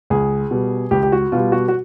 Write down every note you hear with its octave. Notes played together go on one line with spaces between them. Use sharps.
C#2 G#4
B2 G3
C#2 G4
G4
F#4
B2 G3 F4
F#4
F#4